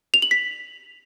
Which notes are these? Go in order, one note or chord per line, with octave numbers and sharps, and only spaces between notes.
F7
F#7
B6